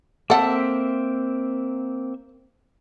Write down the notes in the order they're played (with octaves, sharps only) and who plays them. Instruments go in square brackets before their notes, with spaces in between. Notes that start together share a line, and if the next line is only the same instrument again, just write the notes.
[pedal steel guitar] A#3 C4 E5 [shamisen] A4 F#5